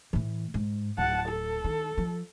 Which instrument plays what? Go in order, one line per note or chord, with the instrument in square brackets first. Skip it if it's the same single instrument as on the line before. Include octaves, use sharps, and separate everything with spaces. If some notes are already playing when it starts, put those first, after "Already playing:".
[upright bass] A2 E3
G#2
[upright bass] D1 [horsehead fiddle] F#5 A5
[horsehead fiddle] A4
[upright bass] D#3
F3